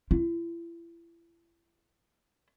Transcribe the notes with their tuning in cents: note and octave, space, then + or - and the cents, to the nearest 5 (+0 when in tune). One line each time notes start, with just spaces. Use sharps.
E4 +35